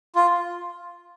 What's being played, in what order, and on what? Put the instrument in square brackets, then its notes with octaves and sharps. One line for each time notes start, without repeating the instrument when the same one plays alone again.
[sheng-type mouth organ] F4